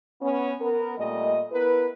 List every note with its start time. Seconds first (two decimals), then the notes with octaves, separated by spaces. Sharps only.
0.22 B3 C#4
0.61 B3 A#4
0.98 A#2 G3 A3 D#5
1.52 B3 E4 A#4 B4